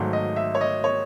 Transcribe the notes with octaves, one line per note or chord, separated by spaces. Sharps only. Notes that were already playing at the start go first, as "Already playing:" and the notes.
Already playing: G#1 G#2 F#3 A3
D#5
E5
C#5
D#5
C#5